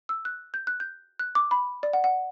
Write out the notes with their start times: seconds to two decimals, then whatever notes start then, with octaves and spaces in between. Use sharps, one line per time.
0.09 E6
0.25 F#6
0.54 G6
0.67 F#6
0.80 G6
1.19 F#6
1.35 D6
1.51 B5
1.83 D5
1.93 F#5
2.04 F#5